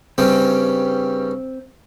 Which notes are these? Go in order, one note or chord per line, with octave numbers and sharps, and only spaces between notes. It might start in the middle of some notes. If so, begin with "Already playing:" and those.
G2 C#3 G3 C4